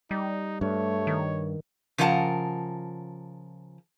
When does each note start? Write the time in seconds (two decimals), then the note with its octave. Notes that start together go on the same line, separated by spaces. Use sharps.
0.11 G3 D#4
0.61 G2 A3 C#5
1.07 D#3
1.98 C#3 F3 A#4 D#5 F#5 A5